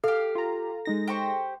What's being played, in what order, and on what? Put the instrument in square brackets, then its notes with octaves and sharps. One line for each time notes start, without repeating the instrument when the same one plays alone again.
[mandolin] G4 F5 [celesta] A4
[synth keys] F4 A#5
G#3 D#4 A#6
[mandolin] G4 C5 C#6